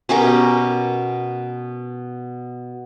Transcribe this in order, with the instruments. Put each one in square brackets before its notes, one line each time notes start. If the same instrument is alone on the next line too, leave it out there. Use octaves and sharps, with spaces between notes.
[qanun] B2 C#4 G4 A#4